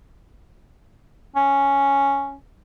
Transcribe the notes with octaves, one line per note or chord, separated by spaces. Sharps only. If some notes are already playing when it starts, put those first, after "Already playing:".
C#4